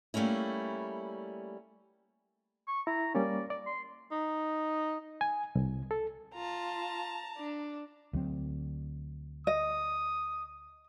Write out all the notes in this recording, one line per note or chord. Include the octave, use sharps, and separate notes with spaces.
G3 A3 A#3 C#4 E4
C#6
E4 A#5
G3 A#3 C#4 D5
D5
C6
D#4
G#5
C2
A4
F4 A5 A#5
D4
D2 F#3 C4
D#5 D#6